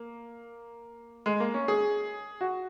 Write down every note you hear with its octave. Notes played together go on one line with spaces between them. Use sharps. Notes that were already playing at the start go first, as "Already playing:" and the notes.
Already playing: A#3
G#3
A#3
C#4
G#4
F#4